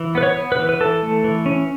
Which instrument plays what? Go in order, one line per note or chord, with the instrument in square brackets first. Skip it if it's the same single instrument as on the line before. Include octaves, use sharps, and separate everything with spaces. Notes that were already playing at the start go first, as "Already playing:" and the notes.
Already playing: [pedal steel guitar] E3
B3 B4
C#5
B3
B4
E3
B4
E3 A4
A3
E3
C#4